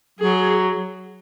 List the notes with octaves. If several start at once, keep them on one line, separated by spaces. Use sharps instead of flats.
F#3 G#4